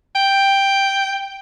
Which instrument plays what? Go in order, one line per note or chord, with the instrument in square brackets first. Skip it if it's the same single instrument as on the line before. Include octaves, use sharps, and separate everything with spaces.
[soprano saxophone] G5